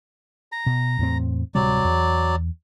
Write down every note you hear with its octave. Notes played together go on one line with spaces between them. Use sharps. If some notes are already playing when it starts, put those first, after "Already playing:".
A#5
B2
E2 A2 C4
D1 C3 F#3 G3 D5
E2